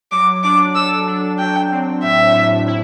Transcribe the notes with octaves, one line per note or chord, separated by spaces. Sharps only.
F#3 D6
D4 D6
A4 E6
D4
F#3 G5
C4
A2 E5
A2
E4